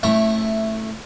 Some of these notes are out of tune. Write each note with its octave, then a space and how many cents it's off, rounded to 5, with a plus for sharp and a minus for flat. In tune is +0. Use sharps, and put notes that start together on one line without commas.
A3 +5 C#4 -35 E4 +0